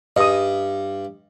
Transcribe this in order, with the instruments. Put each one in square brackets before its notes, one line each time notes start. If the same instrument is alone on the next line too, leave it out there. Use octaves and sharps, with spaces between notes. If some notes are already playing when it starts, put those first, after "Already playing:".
[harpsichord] G2 [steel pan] D#5 D#6